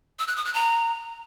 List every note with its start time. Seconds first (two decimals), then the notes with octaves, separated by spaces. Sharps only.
0.19 E6
0.28 F#6
0.36 D#6
0.45 F#6
0.54 A#5